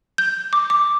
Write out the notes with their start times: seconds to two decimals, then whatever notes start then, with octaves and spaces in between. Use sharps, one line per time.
0.18 G6
0.53 D6
0.70 D6